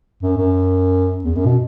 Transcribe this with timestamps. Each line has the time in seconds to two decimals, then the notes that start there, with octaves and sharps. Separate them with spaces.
0.23 F#2
0.37 F#2
1.24 E2
1.35 F#2
1.46 B2